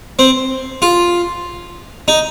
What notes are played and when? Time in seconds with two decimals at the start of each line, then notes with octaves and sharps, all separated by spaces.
0.19 C4
0.82 F4
2.08 D#4